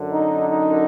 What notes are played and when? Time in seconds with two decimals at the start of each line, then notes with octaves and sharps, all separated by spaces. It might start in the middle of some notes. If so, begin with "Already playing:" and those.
Already playing: F#2 D3
0.12 D#4
0.48 D#4